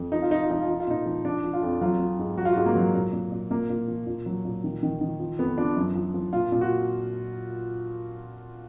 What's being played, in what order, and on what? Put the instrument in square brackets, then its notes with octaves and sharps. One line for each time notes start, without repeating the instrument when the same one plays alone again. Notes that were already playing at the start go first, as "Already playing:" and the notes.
Already playing: [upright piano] F2
F3 D#4
F4
F3 D#4
F4
F3 D#4
F4
F3 D#4
F4
A#2 D#4
F3
F3 D4
F3
F4
F2
F#3 F4
F#3
G#2
F#3 F#4
F4
F#4
G#2
A#3
F#3
A#2
A#2
A#2
A#2 A#3
A#2
F3
A#2
F#3
A#2
D#3
D#3
D#3
F3
F2 B3
F3 D4
F#2
F3
F3
A#2 F4
A#2
F#4